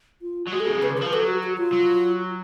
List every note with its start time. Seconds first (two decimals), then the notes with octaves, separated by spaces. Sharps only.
0.22 F4
0.47 F#3
0.52 G#3 F#4
0.60 A4
0.65 B2 G#4
0.77 C#3
0.83 B4
0.90 D3
0.97 F3 B4
1.13 F#3 A4
1.27 F#4
1.43 F#4
1.58 F4
1.72 F#3